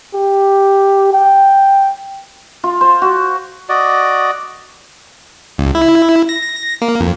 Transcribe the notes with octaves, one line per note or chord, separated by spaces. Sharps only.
G4
G5
F4
C5
F#4
F#4 D5 D#5
C#2
E4
A#6
A#3
F2